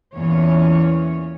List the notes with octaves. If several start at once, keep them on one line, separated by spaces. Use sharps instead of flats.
E2 A#2 E3 C#4 C#5